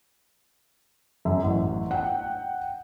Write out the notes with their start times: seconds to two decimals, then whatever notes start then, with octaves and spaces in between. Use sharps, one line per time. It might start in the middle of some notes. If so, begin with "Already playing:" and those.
1.25 F#2
1.44 A1
1.91 F#5 G5